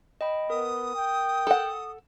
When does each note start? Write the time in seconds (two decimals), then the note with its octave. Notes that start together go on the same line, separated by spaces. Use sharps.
0.21 D#5 G5 B5
0.50 B3 A#4 D#6
0.95 G5
1.47 A4 F#5